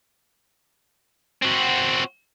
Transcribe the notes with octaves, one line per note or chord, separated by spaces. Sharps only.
C4 F#4